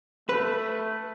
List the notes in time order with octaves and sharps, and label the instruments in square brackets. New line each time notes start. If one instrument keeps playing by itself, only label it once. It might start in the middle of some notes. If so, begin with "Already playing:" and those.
[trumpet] A3 [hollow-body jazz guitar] B4